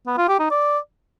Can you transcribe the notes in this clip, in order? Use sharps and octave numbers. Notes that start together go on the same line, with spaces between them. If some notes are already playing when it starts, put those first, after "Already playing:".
B3
F4
G4
D#4
D5